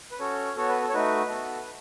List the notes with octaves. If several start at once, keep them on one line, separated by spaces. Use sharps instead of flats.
B4
C#4 F#4 A4 C#5
B3 F#4 A4 C#5
B4
A4
C#5
A3 D#4 F#4 B4
B3 F#4 A4